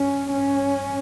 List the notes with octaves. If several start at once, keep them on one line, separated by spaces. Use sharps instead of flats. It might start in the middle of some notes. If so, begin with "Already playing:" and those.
Already playing: G2 C#4
C#4